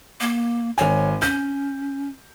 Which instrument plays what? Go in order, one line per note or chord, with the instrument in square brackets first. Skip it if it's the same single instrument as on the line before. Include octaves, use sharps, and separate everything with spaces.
[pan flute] A#3
[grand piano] G#1 G#5 [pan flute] C#5
[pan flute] C#4 [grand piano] G6